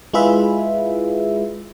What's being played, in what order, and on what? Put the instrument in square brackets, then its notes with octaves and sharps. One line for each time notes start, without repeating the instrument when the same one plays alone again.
[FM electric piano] G#3 E4 F4 G#4 B4 E5